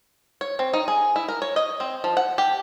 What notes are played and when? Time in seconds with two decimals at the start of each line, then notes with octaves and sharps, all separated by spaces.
0.41 C#5
0.59 C4
0.73 D#4
0.88 G#4
1.16 E4
1.28 A#4
1.42 C#5
1.56 D#5
1.80 C4
2.04 F3
2.17 F#5
2.38 G4